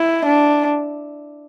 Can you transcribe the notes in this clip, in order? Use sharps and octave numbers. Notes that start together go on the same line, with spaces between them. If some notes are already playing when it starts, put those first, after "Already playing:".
Already playing: E4
D4